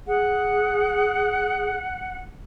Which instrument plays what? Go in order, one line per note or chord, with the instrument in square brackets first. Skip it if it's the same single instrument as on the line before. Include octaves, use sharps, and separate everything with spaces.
[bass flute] G#4 [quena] F#5